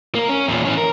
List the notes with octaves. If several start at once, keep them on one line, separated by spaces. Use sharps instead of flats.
A#3 A#4
C#4
E2 A#2
E3 C#4
A#4